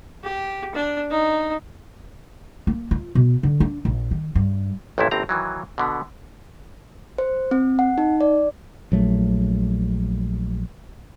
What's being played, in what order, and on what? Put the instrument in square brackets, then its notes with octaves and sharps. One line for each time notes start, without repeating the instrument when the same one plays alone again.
[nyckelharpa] G4
D4
D#4
[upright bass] A#3
F4
B2
D3
D4
A#1
D#3
G2
[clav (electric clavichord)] A1 F2 A#2 A3 E4
G1 A2 C4 A#5
D#3 E3 F#3
B2 D3 B3
[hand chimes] C5
C4
F#5
D#4
D5
[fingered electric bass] A#1 F#3 A3